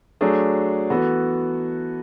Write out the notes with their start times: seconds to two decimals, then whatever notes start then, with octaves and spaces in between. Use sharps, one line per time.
0.21 F#3 A3 D4 G#4
0.90 E3 B3 F#4 A4